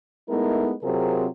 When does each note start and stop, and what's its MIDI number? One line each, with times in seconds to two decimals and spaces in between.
0.30 0.72 56
0.30 0.72 57
0.30 0.72 59
0.30 0.72 63
0.30 0.72 64
0.30 0.72 70
0.83 1.27 48
0.83 1.27 54
0.83 1.27 60
0.83 1.27 65
0.83 1.27 68
0.83 1.27 70